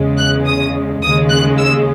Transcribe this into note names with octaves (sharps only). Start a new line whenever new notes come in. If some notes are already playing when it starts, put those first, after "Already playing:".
Already playing: E2 C#3 G#3
F#6
D#6
D#2 C#3 G#3 D#6
F#6
E6